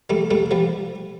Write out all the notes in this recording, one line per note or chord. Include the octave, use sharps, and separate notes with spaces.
G3 A3
G3 A3
F3 G3